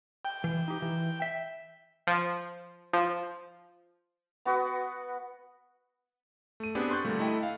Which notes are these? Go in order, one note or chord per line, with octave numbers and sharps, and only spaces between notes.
G5
E3
D#4 G4
E3
E5
F3
F3
B3 F#4 B4
A3 D#7
B3 C4 D4 G4 G#4
C6 C#6 F#6 G6 A6
A#2 D3 G3 A3
A3 E4 D#5 G5
F5